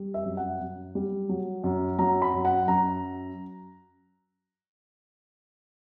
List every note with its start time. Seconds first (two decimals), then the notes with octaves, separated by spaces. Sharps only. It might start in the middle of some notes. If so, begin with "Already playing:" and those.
Already playing: G3
0.14 E5
0.25 F#2
0.37 F#5
0.60 F#2
0.95 G3
1.29 F#3
1.64 F#2
1.99 F#3 A#5
2.22 B5
2.33 F#2
2.45 F#5
2.68 F#2 A#5